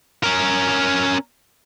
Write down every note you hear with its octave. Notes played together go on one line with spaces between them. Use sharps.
C#4 A#4